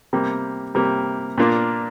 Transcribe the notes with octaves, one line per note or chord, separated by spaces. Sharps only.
C3 G3 A#3
C3 G3 A#3
A#2 A#3 D4 F4